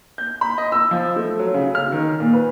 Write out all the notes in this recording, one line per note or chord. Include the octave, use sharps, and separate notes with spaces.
G6
B5
D#5
E6
F3
A3
F#3
C#3
F6
D#3
A#2
B4